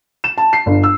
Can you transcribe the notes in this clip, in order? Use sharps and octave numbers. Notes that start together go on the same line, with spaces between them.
E7
A5
C7
G1
E6